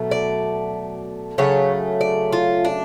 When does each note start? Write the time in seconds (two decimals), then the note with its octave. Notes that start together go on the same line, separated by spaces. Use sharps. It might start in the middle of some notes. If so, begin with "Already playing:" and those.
Already playing: B2 F#3 A3
0.11 D5
1.38 C#3 F#3 A3 C#5
2.01 D5
2.33 F4
2.65 D4